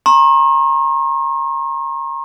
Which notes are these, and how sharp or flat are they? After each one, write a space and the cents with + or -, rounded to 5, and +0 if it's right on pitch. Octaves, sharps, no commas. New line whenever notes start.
A#5 +0 C#6 -45